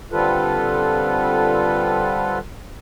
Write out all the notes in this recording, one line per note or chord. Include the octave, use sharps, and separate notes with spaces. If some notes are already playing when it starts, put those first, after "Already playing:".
D3 G3 C4 F4 A4 B4